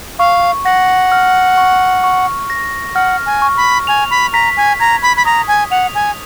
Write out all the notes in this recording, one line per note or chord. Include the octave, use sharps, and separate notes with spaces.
F5 C#6
F#5 A#6
F6
C#6
C#6
A#6
F#5 F6
G#5
C#6
B5
G#5 F7
B5
A#5 B6
G#5
A#5 G#6
B5
B5
A#5 D#6
G#5
F#5 F7
G#5